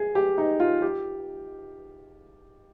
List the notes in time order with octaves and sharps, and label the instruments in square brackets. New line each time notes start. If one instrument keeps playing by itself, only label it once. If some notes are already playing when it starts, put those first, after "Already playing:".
Already playing: [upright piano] G#4
G4
D#4
F4
G4